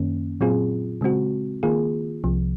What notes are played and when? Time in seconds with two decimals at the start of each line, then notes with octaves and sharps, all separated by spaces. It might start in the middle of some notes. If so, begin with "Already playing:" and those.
Already playing: F#2 D#3 A#3 C#4
0.41 A#2 F#3 C4 F4 G#4
1.01 C#3 G#3 C4 F#4
1.63 D#3 A#3 F4 G#4
2.24 C2 C3 F3